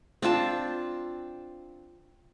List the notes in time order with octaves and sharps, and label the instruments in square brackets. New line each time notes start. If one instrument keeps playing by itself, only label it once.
[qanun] C4 D4 F4 A5